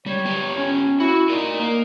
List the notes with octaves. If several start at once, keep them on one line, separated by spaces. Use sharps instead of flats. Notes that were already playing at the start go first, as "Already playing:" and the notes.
G3 C#5
B3 G4
C#4
E4 F#4
D#4 A#4 D5
A#3